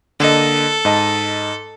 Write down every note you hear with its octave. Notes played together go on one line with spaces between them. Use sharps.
D3 A#3 A4 D#5
G#2 D#5 A5